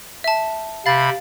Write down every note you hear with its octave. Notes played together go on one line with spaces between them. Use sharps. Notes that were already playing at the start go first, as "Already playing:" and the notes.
E5 A5
C3 F5 B5 A6